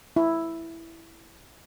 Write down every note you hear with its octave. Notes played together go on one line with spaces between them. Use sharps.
E4